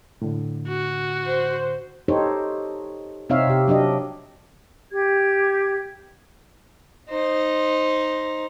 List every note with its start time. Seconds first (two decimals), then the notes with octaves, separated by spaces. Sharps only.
0.22 A2 D3
0.68 F#4
1.27 C5
2.08 D#4 G4 A4 C5 C#5
3.29 C3 C4 D#4 C#5 E5 F5
3.47 C3 G4
3.68 F#3 D4 G4 D#5
4.91 G4 G#6
7.10 D#4 C5